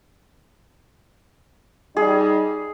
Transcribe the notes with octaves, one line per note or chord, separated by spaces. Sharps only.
G3 D#4 G#4